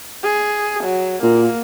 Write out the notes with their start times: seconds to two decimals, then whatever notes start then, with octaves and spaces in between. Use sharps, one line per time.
0.23 G#4
0.83 F#3
1.23 A#2 A#3